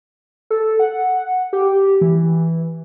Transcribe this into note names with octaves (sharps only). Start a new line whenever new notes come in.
A4
F#5
G4
E3